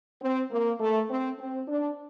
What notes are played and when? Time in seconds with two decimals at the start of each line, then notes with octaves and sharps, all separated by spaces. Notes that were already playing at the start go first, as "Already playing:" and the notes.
0.21 C4
0.51 A#3
0.79 A3
1.10 C4
1.39 C4
1.68 D4